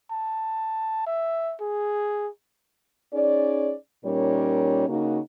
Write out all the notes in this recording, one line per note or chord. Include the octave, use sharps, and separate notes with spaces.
A5
E5
G#4
C#4 D#4 G#4 D5
A#2 G3 C#4 D#4 A#4 C#5
C#3 A#3 D#4 F#4